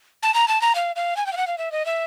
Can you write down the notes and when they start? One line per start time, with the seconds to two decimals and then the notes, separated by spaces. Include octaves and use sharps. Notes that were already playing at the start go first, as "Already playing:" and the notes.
0.23 A5
0.34 A#5
0.48 A5
0.61 A#5
0.75 F5
0.96 F5
1.17 G#5
1.26 G5
1.33 F5
1.37 F#5
1.47 F5
1.58 E5
1.72 D#5
1.85 E5